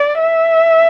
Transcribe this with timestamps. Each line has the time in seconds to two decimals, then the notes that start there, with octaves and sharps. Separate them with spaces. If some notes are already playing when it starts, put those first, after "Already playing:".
Already playing: D5
0.21 E5